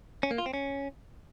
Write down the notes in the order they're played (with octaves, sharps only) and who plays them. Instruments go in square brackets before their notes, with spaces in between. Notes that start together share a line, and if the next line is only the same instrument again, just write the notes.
[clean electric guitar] C#4
A#3
F4
C4
C#4